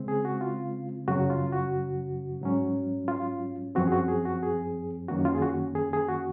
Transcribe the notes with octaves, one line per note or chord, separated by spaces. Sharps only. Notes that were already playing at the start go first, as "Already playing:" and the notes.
Already playing: C#3 G#3 C4
G#4
F#4
F4
F#2 C#3 F#3 F#4
F4
F#4
G#2 F#3 C#4
F4
F#2 F3 C4 F#4
G#4
F#4
G#4
F#4
G#4
F#2 D#3 A#3 C#4 F#4
F4
G#4
F#4
G#4
G#4
F#4